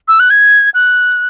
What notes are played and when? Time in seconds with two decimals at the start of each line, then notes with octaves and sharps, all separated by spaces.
0.08 E6
0.20 F#6
0.30 G#6
0.74 F#6